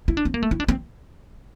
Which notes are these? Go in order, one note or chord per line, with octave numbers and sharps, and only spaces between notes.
E4
D4
C4
A#3
A3
E4
D4
C4